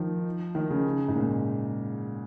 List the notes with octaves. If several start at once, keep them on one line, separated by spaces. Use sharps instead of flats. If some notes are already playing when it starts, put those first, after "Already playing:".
Already playing: D#3 F3
D#3
C#3
G#2
A#2